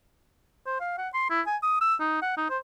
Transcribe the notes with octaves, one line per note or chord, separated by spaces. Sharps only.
C5
F5
F#5
C6
E4
G#5
D#6
E6
D#4
F#5
D#4
C5